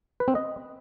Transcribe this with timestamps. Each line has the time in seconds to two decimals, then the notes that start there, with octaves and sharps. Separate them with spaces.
0.20 B4
0.28 C4
0.35 D#5